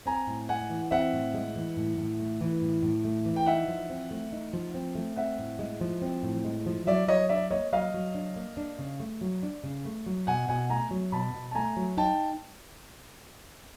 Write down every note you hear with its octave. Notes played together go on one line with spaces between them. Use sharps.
C4 G#5 A#5
A2
G#3 F#5 G#5
E3
C4 E5 F#5
A2
G#3
E3
A2
A2
A3
E3
A2
A2
A3
E3
G5
D#4 E5 F#5
F3
C4
A3
D#4
F3
C4
A3
C4 E5 F#5
A2
G#3
F3
C4
A2
G#3
F3
F#3 D5 E5
F#3 C#5 D#5
D4 D5 E5
A#3 C#5 D#5
F#3 D#5 F5
F#3
D4
A#3
D4
C#3
A3
F#3
D4
C#3
A3
F#3
B2 F#5 G#5
B2 F#5 G#5
A3 G#5 A#5
F#3
B2 A5 B5
B2
A5
A3 G#5 A#5
F#3
D#4 G5 A5